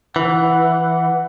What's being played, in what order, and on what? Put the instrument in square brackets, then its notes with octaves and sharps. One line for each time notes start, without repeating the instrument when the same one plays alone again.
[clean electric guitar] E3 [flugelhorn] F#5